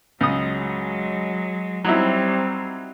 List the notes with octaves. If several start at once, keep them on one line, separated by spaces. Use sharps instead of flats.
C#2 F#3 G#3 D#6
F#3 G3 C4 D#4 E4